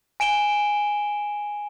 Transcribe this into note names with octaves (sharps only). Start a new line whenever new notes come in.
G#5 D7 E7 G7